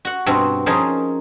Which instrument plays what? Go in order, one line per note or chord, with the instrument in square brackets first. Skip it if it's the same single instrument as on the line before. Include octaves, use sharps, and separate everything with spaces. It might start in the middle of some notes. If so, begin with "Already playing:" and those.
[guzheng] F#4 F#5
G2 B2 B3 C4 F#4
F3 C#4 D#4 G#4 A#4 C5